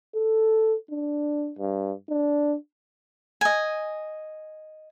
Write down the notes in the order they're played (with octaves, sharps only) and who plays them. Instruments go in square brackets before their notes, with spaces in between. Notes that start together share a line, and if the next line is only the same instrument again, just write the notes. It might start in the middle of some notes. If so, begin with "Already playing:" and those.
[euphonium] A4
D4
G2
D4
[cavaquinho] D#5 G#5